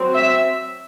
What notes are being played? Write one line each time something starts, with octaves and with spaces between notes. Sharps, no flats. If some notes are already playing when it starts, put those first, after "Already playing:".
Already playing: F#3 C4
E5